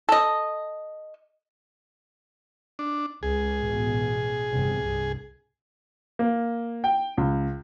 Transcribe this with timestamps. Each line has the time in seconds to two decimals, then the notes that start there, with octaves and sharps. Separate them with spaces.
0.09 A4 D#5
2.79 D4
3.23 C#2 G#4
3.59 A1 B2
4.51 G1 E2 C3
4.80 C2 G2
6.19 A#3
6.84 G5
7.17 C#2